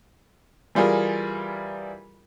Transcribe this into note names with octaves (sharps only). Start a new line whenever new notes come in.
E3 G3 F4 G#4 A#4